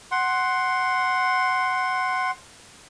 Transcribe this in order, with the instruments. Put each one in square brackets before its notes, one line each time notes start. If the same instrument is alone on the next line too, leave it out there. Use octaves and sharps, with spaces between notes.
[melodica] F#5 C6